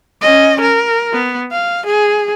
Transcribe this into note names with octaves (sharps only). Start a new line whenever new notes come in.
C#4 D#5
A#4
B3
F5
G#4